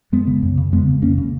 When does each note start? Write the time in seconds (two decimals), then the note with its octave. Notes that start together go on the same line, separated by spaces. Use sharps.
0.12 F#2 G#3 B3
0.27 C#3
0.43 F#2
0.58 C#3
0.72 F2 G#3 B3
0.88 C#3
1.02 F2 A#3 C#4
1.18 C#3